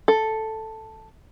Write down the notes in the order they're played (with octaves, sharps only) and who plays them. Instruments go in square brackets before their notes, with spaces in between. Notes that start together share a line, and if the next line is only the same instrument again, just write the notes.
[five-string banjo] A4